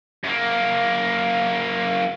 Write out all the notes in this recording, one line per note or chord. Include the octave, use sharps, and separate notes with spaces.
F#2 A#3